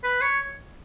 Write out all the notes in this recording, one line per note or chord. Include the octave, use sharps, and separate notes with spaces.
B4
C#5